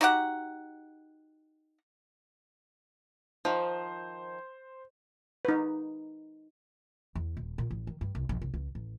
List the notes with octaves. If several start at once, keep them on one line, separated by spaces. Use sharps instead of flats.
D#4 F#4 G4 F#5
D#3 F3 C5
D#4 B4
E2
D#1
A#2
A1
D#3
G2
C2
A#1
C2
C#2
A1